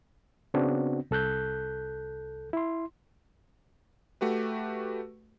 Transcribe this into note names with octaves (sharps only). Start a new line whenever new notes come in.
C#3 B3 C4 D4 F#4
C2 A4 F#6 G6
E4 C6
A3 F#4 G4 B4